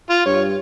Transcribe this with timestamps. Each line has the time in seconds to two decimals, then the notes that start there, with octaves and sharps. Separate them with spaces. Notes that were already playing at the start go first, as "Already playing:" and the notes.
0.10 F4
0.25 G2 C#5